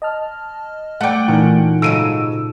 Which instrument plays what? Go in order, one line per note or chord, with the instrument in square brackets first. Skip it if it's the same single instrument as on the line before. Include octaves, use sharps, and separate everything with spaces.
[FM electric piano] D#5 A5 F6
[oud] A3 D5 [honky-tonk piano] F#5 G5
[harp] A#2 C#4 D#4 [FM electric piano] E3 A#4
[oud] G#2 C#3 F#3 [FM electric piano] A4 [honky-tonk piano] E6 D7 D#7